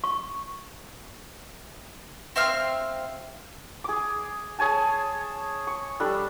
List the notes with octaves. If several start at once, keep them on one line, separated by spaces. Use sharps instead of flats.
C#6
C4 E5 F5 F6
G#4 D6
G#4 C#5 G#5 A5
C#6
G3 D4 A4